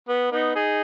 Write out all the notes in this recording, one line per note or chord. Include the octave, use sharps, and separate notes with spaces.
B3
B3 D#4
D#4 G#4